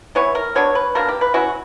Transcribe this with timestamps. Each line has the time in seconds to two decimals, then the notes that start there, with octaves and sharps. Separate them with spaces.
0.15 E3 B3 E4 C#5
0.35 A#4
0.55 F#3 B3 D4 C#5
0.75 B4
0.95 B2 A#3 D4 A#4
1.09 G4
1.21 B4
1.34 F#3 C#4 E4 F#4